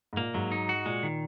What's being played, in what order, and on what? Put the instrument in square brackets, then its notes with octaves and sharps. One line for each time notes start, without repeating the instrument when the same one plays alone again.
[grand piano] G#2
[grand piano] A#2 [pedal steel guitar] A#3
[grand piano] G#2 [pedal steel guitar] F#3
[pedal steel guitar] D#4
F#4
[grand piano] A#2 [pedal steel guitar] G#3
[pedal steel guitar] D#3